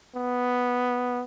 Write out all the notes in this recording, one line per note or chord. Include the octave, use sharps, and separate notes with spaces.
B3